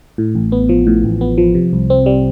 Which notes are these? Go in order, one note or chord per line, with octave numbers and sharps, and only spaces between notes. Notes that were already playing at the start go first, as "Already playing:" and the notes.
A2
A1
B3
F3
A2
A1
B3
F3
C3
C2
C4
G3